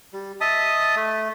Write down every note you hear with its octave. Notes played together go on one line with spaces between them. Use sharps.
G3
D#5 E5 A5 D#6
A3